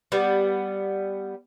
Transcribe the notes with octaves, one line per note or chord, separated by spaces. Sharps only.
G3 B3